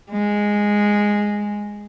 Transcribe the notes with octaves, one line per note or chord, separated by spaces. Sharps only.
G#3